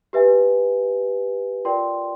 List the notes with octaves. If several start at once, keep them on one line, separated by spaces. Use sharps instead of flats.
G4 B4 E5 G#5
F4 A#4 D5 G5 C6